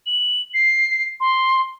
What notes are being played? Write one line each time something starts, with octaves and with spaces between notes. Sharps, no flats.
F#7
C7
C6